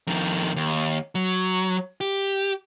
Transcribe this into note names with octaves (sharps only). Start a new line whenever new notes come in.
F2 D#3
D#2
F#3
G4